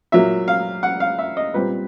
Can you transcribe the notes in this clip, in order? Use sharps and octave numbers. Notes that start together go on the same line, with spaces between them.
A#2 F#3 A#3 E5
F5
F#5
F5
E5
D#5
A#2 G3 C4 B4